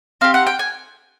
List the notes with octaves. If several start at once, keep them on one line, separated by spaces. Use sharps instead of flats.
C4 D#4 G4 F5
F#5
G5
G#5